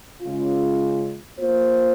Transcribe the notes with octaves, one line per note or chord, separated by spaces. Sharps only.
C#3 G#3 C#4 F4
A#3 F4 C5